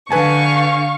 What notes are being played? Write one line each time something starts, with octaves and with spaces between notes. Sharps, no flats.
D3 B4 F5 G#5 A5 C#6